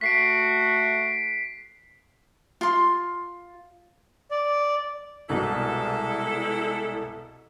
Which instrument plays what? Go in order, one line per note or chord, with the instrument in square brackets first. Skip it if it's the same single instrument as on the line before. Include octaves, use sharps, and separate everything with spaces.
[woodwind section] A3 F#4 [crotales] B6 C7 D7
[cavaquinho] F4 C6
[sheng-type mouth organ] D5
[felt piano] C2 B2 [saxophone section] G#3 E4 A4